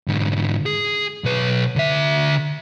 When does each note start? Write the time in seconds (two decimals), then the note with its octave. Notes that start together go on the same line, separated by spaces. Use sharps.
0.08 G#2 D3
0.66 G#4
1.24 B1 B4
1.76 D3 E5